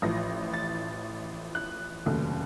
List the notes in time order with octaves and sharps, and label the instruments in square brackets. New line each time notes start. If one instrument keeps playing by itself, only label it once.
[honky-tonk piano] A1 A2 F3 A#6
A6
F#6
F1 D#2 C#3 F#3 A3